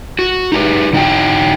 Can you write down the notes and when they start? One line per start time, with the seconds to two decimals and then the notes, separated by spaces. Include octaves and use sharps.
0.19 F#4
0.52 D#4 G4 B4
0.93 D3 D#4 F#4 G5